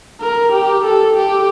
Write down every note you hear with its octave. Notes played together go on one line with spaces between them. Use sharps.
A#4
G4
A4
G4